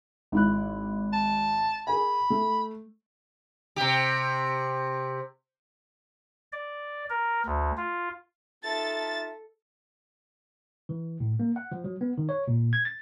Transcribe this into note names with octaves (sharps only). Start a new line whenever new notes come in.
G#1 E4 F#6
A5
G#4 A#4 G#5 B5
A3
C3 G4
D5
A#4
D2
F4
D#4 F4 A4 E5 A5 A6
E3
A2
A#3
F#5
F3
F#3
B3
D#3
C#5
A#2
G#6
A6